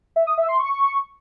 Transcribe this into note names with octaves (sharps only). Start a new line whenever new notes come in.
E5
D#6
E5
C6
C#6